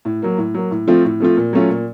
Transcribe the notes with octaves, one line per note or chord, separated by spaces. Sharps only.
A2
F#3 A#3
A2
F#3 A#3
A2
F3 A3 C4 F4
A2
F3 A3 C4 F4
A#2
F#3 A3 C#4 F4
A#2